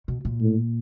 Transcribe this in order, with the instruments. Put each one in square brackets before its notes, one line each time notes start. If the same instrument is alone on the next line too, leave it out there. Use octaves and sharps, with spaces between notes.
[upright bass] B2
A#2
[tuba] A2